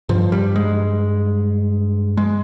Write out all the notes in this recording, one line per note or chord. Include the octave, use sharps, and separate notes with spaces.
G2 F3
G3
G#3
G#3